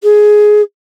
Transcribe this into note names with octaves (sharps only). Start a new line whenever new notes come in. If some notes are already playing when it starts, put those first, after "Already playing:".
G#4